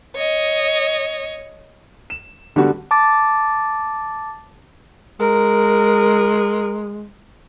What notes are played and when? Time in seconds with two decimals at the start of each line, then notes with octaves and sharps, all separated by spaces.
0.16 C#5 D#5
2.10 E7
2.56 D3 G3 B3 F#4
2.91 A5 D6 A6
5.20 G#3 A#4